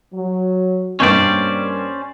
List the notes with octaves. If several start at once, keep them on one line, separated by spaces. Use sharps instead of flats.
F#3
G2 B2 D#3 G3 A#3 C#4 C5 D5